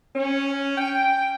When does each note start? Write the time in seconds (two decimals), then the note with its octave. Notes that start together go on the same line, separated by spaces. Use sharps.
0.15 C#4
0.77 G5